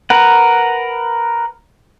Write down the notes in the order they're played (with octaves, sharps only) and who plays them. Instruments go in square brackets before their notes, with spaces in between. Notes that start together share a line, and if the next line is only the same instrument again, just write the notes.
[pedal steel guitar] A#4 B4 F#5